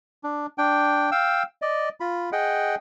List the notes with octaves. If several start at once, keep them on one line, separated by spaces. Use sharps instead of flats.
D4
D4 G5
F5 G5 E6
D5 D#5
F4 B5
G#4 D#5 F#5 G5